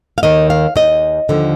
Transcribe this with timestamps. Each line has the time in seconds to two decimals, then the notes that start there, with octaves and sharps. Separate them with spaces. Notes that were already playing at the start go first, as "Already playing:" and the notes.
0.18 F5
0.23 D#2 D#3 D#5
0.50 F5
0.76 D#2 D#3 D#5
1.29 D#2 D3 F3